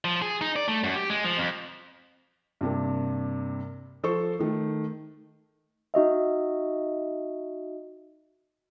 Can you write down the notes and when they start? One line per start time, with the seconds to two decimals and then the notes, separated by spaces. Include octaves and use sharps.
0.05 F3
0.22 G#4
0.41 D#4
0.56 D5
0.68 A3
0.84 F#2
0.96 G4
1.10 G#3
1.24 F3
1.37 F2
2.61 G2 C3 A#3
4.03 F3 A4 C5 C#6
4.39 D#3 A3
5.94 D#4 F#4 D#5 E5